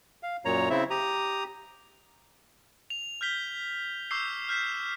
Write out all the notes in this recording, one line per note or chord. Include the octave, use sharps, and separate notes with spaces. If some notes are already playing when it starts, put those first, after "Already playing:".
F5
F#2 A#2 C#5 A#5
C#3 C4 E4 E5
G4 A#5 D#6
F7
F6 G6 B6 G7
C#6 D6 E6 G6 C7
F6 G6 B6 E7